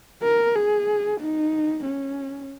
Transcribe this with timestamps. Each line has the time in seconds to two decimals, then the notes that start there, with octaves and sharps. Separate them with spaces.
0.23 A#4
0.55 G#4
1.21 D#4
1.85 C#4